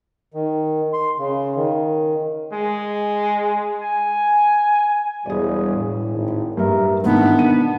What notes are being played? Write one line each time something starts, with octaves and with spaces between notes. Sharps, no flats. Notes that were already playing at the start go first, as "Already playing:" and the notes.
D#3
C6
C#3
D#3
G#3
G#5
E1 G3 G#4 D5
A2
G#1
G2 G3 A#4 E5
G#2 B2 D#3 E3 B3 D4
D#7